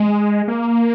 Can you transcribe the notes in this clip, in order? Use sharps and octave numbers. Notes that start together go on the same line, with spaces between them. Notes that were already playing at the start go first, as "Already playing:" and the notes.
Already playing: G#3
A#3